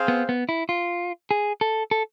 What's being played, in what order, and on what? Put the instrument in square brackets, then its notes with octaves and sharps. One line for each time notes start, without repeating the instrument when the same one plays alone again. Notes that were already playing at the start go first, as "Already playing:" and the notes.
Already playing: [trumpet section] C4 G#4 C5 F5
[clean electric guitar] B3
B3
E4
F4
G#4
A4
A4